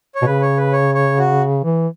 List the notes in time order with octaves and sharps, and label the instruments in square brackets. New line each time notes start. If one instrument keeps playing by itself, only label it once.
[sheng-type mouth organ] C#5
[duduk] B2
[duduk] C#3 [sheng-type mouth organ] B4
[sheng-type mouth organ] C#5
B4
C#5
C#5
F#4
[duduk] E3